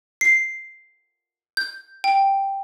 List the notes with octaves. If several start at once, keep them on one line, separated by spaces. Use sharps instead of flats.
C7
G6
G5